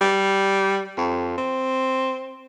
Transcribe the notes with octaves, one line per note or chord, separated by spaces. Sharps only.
G3
F2
C4